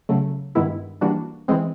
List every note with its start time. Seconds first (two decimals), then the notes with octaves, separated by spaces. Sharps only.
0.09 C#3 F#3 A3
0.55 G2 D#3 G#3 B3 E4
1.01 E3 G3 A#3 D4 F#4
1.48 E3 G#3 C4